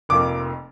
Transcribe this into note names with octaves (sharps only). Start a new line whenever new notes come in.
F1 F2 F3 A#3 D6